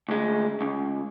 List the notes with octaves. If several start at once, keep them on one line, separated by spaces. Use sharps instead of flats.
D2 G#3
C#2